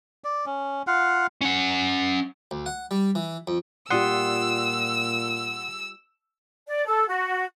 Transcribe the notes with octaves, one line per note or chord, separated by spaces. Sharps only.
D5
C#4
F4 F5 F#5
C#4 F#5
D2
F#5
G3
E3
F2
A#2 G3 F4 G4 F#5 C6 D#6 E6
D5
A4
F#4